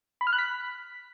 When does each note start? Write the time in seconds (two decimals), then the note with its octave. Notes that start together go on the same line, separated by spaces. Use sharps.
0.21 B5
0.27 F6
0.33 F#6
0.38 B6